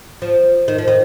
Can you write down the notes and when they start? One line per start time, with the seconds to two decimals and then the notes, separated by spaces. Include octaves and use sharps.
0.22 F3
0.68 D#3
0.78 F3
0.88 D#3